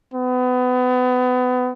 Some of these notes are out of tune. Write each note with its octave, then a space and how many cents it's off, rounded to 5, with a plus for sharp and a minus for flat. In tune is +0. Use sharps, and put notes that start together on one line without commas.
B3 +30